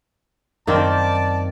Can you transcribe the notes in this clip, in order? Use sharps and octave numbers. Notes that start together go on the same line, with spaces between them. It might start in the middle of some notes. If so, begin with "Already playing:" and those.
F#2 D#3 A#3 C4 D5 A5